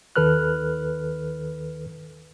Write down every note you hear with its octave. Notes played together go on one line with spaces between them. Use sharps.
D#2 D#3 A4 B4 F6 F#6